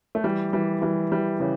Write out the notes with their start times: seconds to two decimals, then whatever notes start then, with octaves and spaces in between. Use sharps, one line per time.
0.15 A3
0.24 E3 G3
0.53 E3 G3
0.82 E3 G3
1.12 E3 G3
1.40 C#3 E3